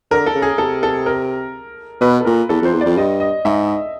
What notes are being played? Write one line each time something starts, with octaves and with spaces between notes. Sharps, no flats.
D3 A#4
A4
C#3
G#4
C3 A4
A4
A#4
B2 B4
A4
A#2 A#4
E2 A4
F2 C5
E2
F2 D5
G2 D#5
D#5
G#2 E5